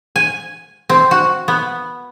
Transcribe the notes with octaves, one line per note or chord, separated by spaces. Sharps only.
G#5
C4
F#4
B3